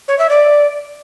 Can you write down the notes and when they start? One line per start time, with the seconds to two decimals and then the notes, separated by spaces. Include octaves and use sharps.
0.08 C#5
0.19 E5
0.30 D5